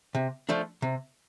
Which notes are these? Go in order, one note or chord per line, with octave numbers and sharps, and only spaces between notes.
C3
F3 A3 D4
C3